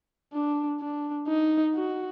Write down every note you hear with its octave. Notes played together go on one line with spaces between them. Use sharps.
D4
D4
D#4
F#4